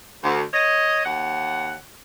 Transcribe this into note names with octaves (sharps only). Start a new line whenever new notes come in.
D2
C#5 D#5
D#2 F#5